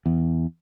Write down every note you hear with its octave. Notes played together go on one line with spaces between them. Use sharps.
E2